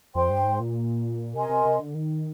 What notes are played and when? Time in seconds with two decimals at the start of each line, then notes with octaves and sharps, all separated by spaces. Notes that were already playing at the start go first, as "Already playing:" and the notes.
0.14 F2 C5 G5 C6
0.30 G2
0.44 G#2
0.60 A#2
1.34 C3 A#4 D#5 G#5 C6
1.49 C3
1.65 C3
1.80 D3
1.95 D#3